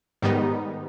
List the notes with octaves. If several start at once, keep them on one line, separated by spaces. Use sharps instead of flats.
G#2 D#3 G3 B3 D#4